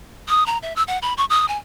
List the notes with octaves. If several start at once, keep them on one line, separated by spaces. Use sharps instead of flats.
D#6
A#5
E5
E6
F#5
B5
C#6
D#6
G#5